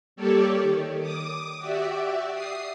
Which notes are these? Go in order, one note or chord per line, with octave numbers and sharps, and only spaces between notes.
G3 A#3 G4 A4 C#5 D5
D#3
D6 D#6
F#4 G4 D5 E5
D#6 C7